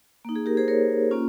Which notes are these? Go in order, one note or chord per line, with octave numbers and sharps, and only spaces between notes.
A#3 D#4
G#4
G4 A#4
G#4 C5
A#4 C#5
A#3 C#4 F4